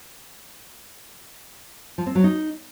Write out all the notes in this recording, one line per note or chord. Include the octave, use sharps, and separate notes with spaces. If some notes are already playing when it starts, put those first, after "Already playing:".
F3
C4
F#3
D#4